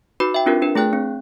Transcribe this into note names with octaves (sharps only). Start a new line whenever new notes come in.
D#4 F#4 B4 B5 D6
E5 G5
C4 D4 F4 G4 A#4
D4 B4
A3 G#4 G5 F#6
C4